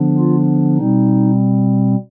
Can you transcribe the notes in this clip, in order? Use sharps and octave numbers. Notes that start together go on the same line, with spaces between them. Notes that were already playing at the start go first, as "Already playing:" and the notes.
Already playing: D3 F3 B3 D4
F4
B2 G3 C4 D#4